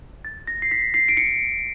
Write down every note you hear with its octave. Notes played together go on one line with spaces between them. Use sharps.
A6
A#6
C7
B6
C7
D7
C#7